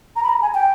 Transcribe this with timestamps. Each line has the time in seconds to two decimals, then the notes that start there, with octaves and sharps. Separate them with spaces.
0.16 A#5
0.23 B5
0.29 A#5
0.42 G#5
0.55 G5